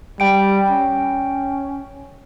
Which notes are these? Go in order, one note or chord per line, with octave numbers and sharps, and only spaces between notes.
G3 G5 D7
C#4